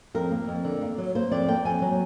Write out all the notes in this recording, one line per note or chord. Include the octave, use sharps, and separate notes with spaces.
F2 A#4
A#3
F2
D3
A#3
F#3
A#3 C5
F2 D5
A#3 G5
F2 G#5
F#3